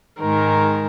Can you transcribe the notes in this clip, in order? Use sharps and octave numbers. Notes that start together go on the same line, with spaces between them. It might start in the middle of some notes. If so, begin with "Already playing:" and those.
G#2 D#3 G#3 A#4